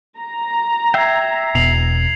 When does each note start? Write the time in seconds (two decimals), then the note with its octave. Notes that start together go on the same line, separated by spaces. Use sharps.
0.18 A#5
0.94 E5 G5 G#6 C7
1.55 E1 B2 C7 F7 F#7